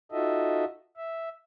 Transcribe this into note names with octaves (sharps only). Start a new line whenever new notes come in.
D#4 F4 F#4 A4 D#5 E5
E5